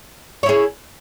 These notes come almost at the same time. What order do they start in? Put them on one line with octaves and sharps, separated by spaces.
C#5 E4 G#4